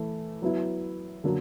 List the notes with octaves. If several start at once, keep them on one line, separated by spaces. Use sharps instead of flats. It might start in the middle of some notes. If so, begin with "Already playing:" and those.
Already playing: E3 A3
F#3 B3 E4
D3 F#3 A#3